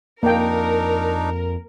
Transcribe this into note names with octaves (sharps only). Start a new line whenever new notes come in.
F2 A#3 D4 D#4 A#4 G5